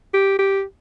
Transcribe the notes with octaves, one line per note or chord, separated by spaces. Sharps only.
G4
G4